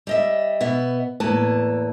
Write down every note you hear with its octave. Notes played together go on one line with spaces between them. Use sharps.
G3 D#5 E5
B2 B3 E5
E2 A2 A#3 B4 A5